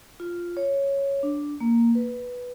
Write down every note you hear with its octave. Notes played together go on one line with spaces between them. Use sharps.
F4
C#5
D4
A#3
B4